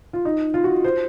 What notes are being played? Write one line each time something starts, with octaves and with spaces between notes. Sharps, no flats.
F4
D#4
F4
F#4
C5